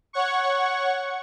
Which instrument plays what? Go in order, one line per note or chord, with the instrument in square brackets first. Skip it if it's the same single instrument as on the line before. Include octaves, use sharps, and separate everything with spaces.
[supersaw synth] C#5 F#5 C#6